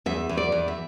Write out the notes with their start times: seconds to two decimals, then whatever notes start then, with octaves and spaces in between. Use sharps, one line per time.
0.06 E2 E5
0.29 E2
0.37 D5
0.52 E2
0.68 E5